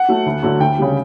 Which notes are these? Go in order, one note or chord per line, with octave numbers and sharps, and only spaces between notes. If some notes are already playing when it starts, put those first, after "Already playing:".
Already playing: F#5
F#3 A3
D2
D3 F#3 A3
D2 G5
C#3 G3